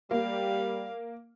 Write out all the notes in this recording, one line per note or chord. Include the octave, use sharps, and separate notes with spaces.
G3 A#3 F5